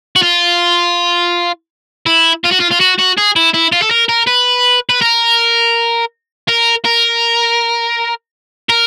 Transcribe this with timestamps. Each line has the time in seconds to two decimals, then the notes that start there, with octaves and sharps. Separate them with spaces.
0.16 F#4
0.23 F4
2.06 E4
2.44 F4
2.51 F#4
2.60 F4
2.71 F4
2.80 F#4
2.98 F#4
3.17 G#4
3.36 E4
3.54 E4
3.72 F4
3.82 A4
3.91 A#4
4.09 A#4
4.27 B4
4.90 B4
5.01 A#4
6.48 A#4
6.85 A#4
8.69 A#4